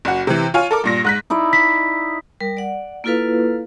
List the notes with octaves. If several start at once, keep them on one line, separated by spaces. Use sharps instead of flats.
F#1 F#4
C3 E3
F4 C#5 F5 G#5
A4 A#4 D6
G2 A#2 A#6
G#2 F#6 B6
D#4 E4 D5
B6
G3 A#4
D5 F#5
A#3 E4 F4 A4 B4 F5